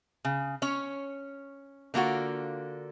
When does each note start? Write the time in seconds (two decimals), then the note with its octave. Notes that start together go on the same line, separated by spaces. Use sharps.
0.25 C#3
0.62 C#4 C#5
1.94 D3 A#3 F4 F#4